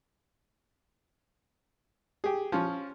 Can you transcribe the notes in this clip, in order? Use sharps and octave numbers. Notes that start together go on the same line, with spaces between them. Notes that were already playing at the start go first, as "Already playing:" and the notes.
G4 G#4
F3 C#4